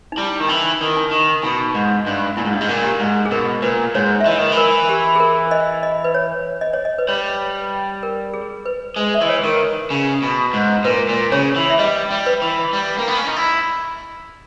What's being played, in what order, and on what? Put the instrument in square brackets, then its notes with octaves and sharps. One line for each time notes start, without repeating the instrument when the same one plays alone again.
[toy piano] D#4
[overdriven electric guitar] G3 [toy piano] E4
[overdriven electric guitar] D#3
[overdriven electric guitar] E3 [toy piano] D#4
[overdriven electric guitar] D#3
[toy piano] E4
D#4
[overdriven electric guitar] D#3
[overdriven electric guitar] B2 [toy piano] D#4
[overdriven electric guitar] G#2
[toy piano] D#4
[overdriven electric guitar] G2
[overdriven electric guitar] A#2 [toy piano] E4
[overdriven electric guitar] G#2
G2
G#2
A#2
[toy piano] G4
[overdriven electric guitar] G#2
[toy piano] G#4
[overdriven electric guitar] B2 [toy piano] A#4
[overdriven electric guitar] A#2 [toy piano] B4
[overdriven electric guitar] G#2 [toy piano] C#5
[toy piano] E5
[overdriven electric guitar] E3 [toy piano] D#5
[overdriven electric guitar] D#3
E3
[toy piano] A#4
G4
G#4
A#4
D#5
D#5
B4
C#5
D#5
C#5
D#5
B4
[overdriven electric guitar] G3 [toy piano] C#5
[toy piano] A#4
G#4
B4
[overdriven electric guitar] G#3 [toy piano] B4
[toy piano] E5
[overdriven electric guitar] E3 [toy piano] D#5
[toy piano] C#5
B4
[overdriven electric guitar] D#3 [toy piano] A#4
[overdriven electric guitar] C#3
B2
G#2
[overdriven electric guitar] A#2 [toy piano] B4
[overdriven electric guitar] A#2
[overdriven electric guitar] C#3 [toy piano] C#5
[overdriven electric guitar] E3
[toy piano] E5
[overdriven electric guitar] G3 [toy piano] D#5
[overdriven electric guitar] G3
[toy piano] B4
[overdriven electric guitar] E3
G3
A#3
B3
C#4
D#4
E4